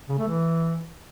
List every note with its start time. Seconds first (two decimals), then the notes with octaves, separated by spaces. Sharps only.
0.09 C#3
0.18 A3
0.28 E3